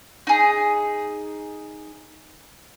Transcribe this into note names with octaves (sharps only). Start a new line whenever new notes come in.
D#4 G#4